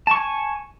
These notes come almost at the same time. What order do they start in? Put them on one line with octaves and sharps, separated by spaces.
A5 C#6 G#5